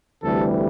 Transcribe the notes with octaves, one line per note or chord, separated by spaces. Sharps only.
D2 C3 E3 G3 A4